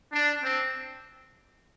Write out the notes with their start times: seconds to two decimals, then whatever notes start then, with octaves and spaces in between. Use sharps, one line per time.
0.12 D4
0.43 C4